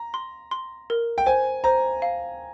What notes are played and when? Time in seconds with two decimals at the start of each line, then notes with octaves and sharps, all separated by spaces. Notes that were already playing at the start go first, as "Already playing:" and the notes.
Already playing: A#5
0.14 C6
0.51 C6
0.90 A#4
1.18 G5
1.26 C5 G#5
1.64 C5 A#5
2.02 F5